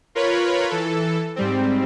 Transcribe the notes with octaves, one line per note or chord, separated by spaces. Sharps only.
F4 A#4 B4 C#5 B5
E3 A4
G#2 G3 C4